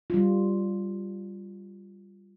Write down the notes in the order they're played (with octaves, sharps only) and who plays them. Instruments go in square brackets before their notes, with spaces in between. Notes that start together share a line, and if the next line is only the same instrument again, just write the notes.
[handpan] G3 F4